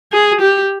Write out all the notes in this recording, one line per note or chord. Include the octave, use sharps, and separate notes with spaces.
G#4
G4